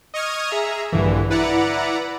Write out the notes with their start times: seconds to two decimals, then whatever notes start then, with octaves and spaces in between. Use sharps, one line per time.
0.14 D#5 C#6 D#6 F6 G#6
0.50 G#4 E5 A#5
0.92 A#1 G2 D3 E3
1.30 E4 B4 D5 F#5 A#5